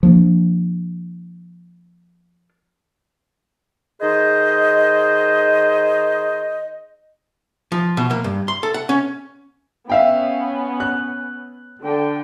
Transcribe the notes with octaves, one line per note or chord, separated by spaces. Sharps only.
F3 A#3 D4
D#3 G#4 C5 D#5
F3
B2
A#3
G2
C6
A4
F#5
C#4
B3 C#4 E5 F5 G5
F#6
D3 G5